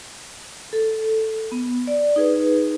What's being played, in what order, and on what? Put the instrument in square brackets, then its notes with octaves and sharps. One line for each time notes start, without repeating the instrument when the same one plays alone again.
[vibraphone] A4
B3
D5
D#4 G#4 B4